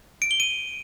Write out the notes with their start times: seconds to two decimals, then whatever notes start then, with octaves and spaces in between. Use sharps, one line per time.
0.22 D7
0.31 G7
0.40 D#7